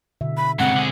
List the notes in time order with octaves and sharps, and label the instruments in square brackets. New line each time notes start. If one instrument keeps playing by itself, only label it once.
[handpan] B2 D3 E5
[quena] B5
[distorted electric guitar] G2 C#3 [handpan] G#3 C4 [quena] F#5
[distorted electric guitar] D3 G#4